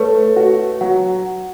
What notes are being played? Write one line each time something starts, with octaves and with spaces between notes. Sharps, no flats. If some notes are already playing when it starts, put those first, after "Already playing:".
Already playing: A3 A4 B4 C#5
F#4
F#3 F#5